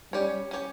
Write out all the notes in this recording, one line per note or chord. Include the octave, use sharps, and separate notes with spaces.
G3 C#4 G4 C#5
C#4 G4 C#5